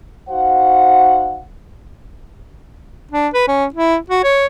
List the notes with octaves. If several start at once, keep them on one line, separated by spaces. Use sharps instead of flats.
D#4 F#4 C5 F5 F#5
D4
B4
C#4
E4
F#4
C#5